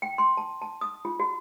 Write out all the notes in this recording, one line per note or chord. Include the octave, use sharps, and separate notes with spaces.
G5
C6
A5
A5
D#6
F4
F#4